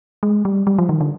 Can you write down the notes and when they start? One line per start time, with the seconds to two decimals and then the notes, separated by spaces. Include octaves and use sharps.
0.23 G#3
0.45 G3
0.67 G3
0.78 F3
0.89 D#3
1.01 D3